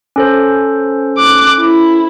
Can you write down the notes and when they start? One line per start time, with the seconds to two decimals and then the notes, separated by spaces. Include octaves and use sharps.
0.16 C#4 A4 C5
1.17 D6 F#6
1.59 E4